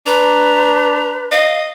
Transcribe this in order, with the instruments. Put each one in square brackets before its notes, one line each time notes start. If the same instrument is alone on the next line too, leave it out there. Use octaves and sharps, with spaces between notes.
[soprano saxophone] D4 [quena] B4 [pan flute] A#5
[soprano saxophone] D#5 [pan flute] F5